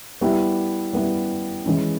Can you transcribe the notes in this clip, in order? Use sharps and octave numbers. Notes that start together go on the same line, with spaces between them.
G3 B3 E4 G4
G3 B3 E4 G4
E3 G#3 C#4 E4